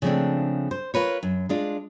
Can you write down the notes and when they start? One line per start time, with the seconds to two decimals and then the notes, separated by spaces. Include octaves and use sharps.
0.02 C#3 F3 G#3 A3 C4 D4
0.71 C5
0.94 F4 A#4 B4 C#5
1.23 F#2
1.49 G#3 D4 F4